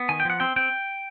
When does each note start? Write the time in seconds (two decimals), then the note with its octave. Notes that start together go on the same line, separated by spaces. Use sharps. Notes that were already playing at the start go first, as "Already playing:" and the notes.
Already playing: B3
0.09 D#3 G#5
0.20 G5
0.25 F3 F#5
0.40 C4 G5
0.56 C4 G5